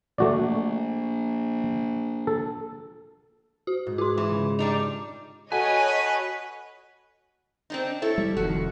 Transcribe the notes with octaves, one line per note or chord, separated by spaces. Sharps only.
A#1 A3 F#4 D5
A4
F#4
G#2
F4 G#4 C6
E3
C#3
G3 D4 D#4 F7
F#4 A4 B4 C#5 D#5 G#5
C4 D4 D#4
E4 A4 C#5
G3
F1 F2 D#3 F#4